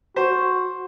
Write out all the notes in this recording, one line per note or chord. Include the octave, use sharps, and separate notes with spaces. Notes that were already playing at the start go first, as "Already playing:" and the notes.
F#4 C5